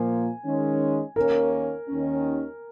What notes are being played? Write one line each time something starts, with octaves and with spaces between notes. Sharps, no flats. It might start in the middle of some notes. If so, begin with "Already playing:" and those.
Already playing: A#2 F3 A#3 G#5
D#3 G#3 C#4
D#2 D#3 A#3 C#4 A#4
D#2 D#3 C#4